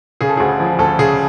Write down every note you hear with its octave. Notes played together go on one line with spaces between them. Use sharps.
C#3 G#4
A4
D2 G#4
F3
D2 A4
C#3 G#4